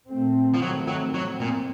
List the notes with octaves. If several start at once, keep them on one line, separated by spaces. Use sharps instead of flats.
A#2 A3 C4
F3
D#3 F#3 A3 C4
F#3
A2 F3 F#3 C4
A#2